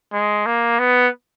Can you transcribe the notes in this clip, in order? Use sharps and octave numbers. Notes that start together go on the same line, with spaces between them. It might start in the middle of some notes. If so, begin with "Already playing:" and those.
G#3
A#3
B3